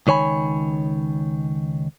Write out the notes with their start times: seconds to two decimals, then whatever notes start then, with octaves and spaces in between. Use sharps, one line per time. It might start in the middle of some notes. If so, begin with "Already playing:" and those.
0.07 C#2 D#3 C#5 G#5 B5